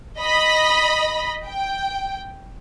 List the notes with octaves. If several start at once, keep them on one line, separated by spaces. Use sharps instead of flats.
D#5 B5
G5